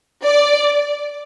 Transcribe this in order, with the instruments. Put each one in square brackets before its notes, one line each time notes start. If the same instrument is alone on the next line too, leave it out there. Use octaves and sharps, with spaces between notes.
[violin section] D5